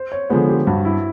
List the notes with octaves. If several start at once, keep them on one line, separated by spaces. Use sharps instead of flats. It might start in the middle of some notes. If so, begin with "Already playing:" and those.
Already playing: C5
C#5
D3 F3 G#3 B3 C5
G4
G2 F#4
E4